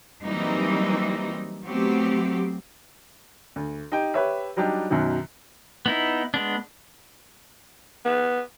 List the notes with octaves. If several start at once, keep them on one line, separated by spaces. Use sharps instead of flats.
E3 F#3 G3 A#3 C4 D#4
F#3 A3 B3 C4 G4
D2
D#4 G4 G5
G4 B4 C#5 E5
F#3 G3 D4 D#4 G4
F#2 B2 D#3 F#3
B3 D#4 E4
G#3 B3 D4
B3